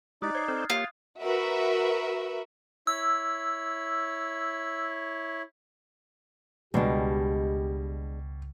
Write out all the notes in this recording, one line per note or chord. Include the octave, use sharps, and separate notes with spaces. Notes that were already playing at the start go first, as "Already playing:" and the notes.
G#3 D#4 E4 G4 D5 D#6 F#6 A6
C5 C#5 G#6 C7
C4 A4 C5 F6
A#3 F4 G4 C#5 D#6
F#4 A#4 B4 E5
E4 C#5 E6
C#2 B2 G3 G#3 D4 G4